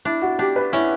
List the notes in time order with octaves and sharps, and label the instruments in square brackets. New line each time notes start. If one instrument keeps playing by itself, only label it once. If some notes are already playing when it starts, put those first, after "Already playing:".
[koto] D4 [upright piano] E4
[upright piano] F#4
[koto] D4 [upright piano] G4
[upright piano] B4
[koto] C#4 [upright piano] E4